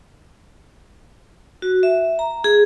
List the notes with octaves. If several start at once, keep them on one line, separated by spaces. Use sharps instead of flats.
F#4
E5
A#5
G#4